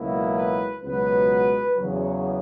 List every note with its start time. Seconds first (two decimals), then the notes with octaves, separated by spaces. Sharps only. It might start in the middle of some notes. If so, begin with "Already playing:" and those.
Already playing: C#2 B2 F#3 A#3 E4
0.36 B4
0.83 C#2 B2 F#3 B3 B4
1.76 E2 C#3 F#3